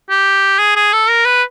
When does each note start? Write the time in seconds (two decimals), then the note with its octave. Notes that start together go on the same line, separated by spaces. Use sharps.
0.10 G4
0.59 G#4
0.76 G#4
0.93 A4
1.09 A#4
1.25 B4